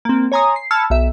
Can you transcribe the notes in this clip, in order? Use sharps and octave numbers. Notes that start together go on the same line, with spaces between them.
A#3 C4
C#5 G#5 A#5 C6 D#6
C7
A5 B5 E6 F6 G#6 C#7
B1 E5